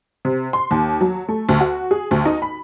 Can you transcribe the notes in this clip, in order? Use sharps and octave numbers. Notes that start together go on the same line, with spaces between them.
C3
C6
D#2
F#3
A3
D2
F#4
G#4
D2
D#4
B5